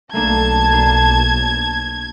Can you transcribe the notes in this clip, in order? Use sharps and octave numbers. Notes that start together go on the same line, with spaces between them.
B1 A3 A#3 D4 A5 G#6
A#3 D4